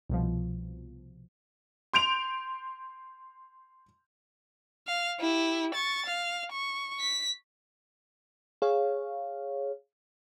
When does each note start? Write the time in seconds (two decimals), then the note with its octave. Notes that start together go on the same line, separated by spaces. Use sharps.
0.09 C2 B2 F3
1.93 C6 G6 D7 F7
4.87 F5
5.20 E4 G4
5.74 C#6 A6
6.06 F5
6.52 C#6
7.00 B6
8.62 G#4 C#5 F5